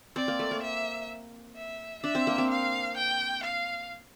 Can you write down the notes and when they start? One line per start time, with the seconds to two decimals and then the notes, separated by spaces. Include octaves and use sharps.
0.16 C4 D5
0.28 A#3
0.39 A3
0.51 A#3
0.63 E5
1.56 E5
2.03 D4 E5
2.15 C4
2.27 A#3
2.38 C4
2.50 F5
2.97 G5
3.44 F5